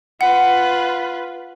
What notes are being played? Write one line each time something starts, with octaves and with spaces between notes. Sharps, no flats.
F4 B4 F#5